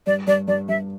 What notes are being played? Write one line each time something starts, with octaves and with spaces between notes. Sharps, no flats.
G2 D5
G2 D5
G2 D5
G2 E5